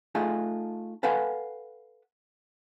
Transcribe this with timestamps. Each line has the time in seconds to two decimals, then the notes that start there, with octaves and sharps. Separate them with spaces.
0.15 A3 D#4 F4 G#4
1.03 A4 B4 F5 F#5 G#5